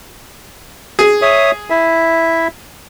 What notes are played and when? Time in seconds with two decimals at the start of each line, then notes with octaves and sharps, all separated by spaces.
0.99 G#4
1.22 C#5 E5 D#6
1.70 E4 E5